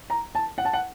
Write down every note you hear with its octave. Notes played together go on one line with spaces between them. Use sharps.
A#5
A5
F#5
A5
F#5